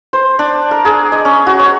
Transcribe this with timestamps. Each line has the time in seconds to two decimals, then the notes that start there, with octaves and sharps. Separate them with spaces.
0.13 C5
0.39 D4
0.71 A#4
0.85 G#4
1.12 D#5
1.25 C#4
1.47 F#4
1.59 C#5